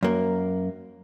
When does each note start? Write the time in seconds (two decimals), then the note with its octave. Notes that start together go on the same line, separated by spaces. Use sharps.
0.03 F#2 A#3